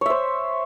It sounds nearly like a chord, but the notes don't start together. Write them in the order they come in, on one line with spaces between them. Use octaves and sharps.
C#5 E5 C5